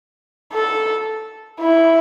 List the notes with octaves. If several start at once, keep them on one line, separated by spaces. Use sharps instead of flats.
A4
E4